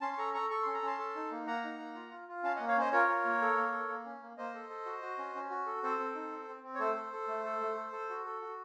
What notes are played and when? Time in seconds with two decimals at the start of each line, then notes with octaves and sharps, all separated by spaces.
0.01 C#4 A5 C6
0.13 C6
0.17 A4 A#5 C#6
0.34 A4 A#5 C#6
0.50 A4 C#6
0.62 C#4 C6
0.74 A#5
0.82 C#4 A5 C6
0.99 A4
1.15 D#4
1.31 A#3
1.46 A#3 F#5 A#5
1.64 D#4
1.79 A#3
1.95 F4
2.11 F4
2.28 F4
2.43 C#4 F5 A5
2.56 A#3 D#5 F#5
2.68 C#5 F5
2.77 C#4 C5 D#5
2.92 F4 A#4 C#5
3.09 F4
3.25 A#3
3.41 A4
3.57 A#3
3.72 A4
3.89 A#3
4.05 C#4
4.22 A#3
4.37 A#3 C5 D#5
4.54 A4
4.70 A4
4.85 F#4
5.02 F#4
5.18 C#4
5.35 C#4
5.50 F#4
5.66 A4
5.83 C4 A4 C5
6.00 C4
6.15 D#4
6.31 C4
6.48 C4
6.63 C4
6.75 C#5
6.79 A3 A4 C5
6.96 A4
7.12 A4
7.28 A3
7.45 A4
7.60 A3
7.76 A4
7.92 A4
8.10 F#4
8.25 A4
8.41 F#4